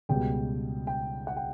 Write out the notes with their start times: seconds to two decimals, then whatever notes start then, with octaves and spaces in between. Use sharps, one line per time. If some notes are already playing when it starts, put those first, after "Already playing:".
0.09 C#2 B2 G3 G5
0.87 G5
1.27 F#5
1.37 G5